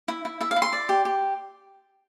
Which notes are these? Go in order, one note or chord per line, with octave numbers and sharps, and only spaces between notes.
E4
E4
E4 E5
F5
E4
C6
D5
G4
G4